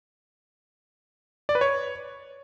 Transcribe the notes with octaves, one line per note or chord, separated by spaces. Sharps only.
D5
B4
C#5